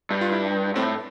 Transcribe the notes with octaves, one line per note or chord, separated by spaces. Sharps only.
G2
F4
E4
A2 C4